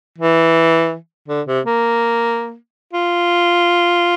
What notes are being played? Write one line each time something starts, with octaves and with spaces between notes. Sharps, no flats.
E3
D3
C3
A#3
F4